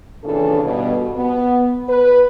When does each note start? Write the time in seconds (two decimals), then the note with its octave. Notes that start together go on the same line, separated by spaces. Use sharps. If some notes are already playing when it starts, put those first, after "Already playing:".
0.23 D#2 A#2 C#3 E3 D4 A4
0.64 G2 B2
1.16 B3
1.89 B4